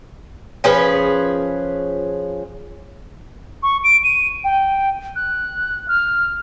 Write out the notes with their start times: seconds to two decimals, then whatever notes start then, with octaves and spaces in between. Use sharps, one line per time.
0.64 F3 C#4 G#4 B4
3.63 C#6
3.84 D7
4.04 D#7
4.44 G5
5.16 F#6
5.88 F6